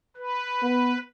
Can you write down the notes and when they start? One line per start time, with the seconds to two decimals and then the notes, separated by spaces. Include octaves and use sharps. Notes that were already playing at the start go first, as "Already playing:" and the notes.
0.17 B4
0.62 B3